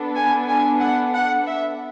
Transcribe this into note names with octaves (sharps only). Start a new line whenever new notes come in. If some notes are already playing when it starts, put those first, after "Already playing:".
Already playing: B3 D4 A4
G#5
G#5
F#5
F#5
E5